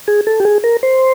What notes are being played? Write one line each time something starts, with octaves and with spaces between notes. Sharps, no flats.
G#4
A4
G4
G#4
A#4
C5